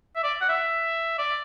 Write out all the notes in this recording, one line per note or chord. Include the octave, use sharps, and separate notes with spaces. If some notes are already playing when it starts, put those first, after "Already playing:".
E5
D5
F#5
E5
D5